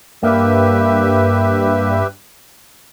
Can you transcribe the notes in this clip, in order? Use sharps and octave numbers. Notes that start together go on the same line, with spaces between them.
G2 A#3 G4 B4 E5